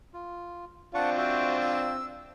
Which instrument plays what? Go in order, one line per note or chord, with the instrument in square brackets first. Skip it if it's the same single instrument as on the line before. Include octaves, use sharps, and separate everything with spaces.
[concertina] F4
[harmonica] C4 D4 F4 [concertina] F#5 A5 C#6
[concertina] F#4 C5 E5
E6